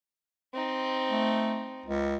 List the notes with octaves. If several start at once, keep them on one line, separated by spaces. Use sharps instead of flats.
C4 D#4
A3
C#2